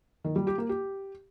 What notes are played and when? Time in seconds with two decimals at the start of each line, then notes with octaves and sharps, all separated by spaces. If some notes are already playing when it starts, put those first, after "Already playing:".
0.24 D#3
0.36 G3
0.47 G4
0.58 A#3
0.69 G4